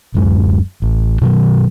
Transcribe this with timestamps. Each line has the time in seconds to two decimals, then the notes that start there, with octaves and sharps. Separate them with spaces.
0.15 D1 F#2 G#3
0.82 A1
1.21 B2 D#3 F3 F#3